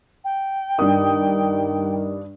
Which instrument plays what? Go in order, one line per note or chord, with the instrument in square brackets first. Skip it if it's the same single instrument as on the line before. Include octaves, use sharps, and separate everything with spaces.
[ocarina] G5
[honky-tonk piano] G2 D4 D#6 [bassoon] D#3